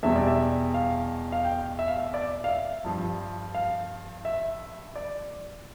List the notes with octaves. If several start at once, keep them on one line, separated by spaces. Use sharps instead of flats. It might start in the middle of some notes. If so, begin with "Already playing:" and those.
E2 B2 G3 E5
D5
E5
F5
F5
G5
E5
F5
E5
D5
F5
E5
G2 F3
F5
E5
D5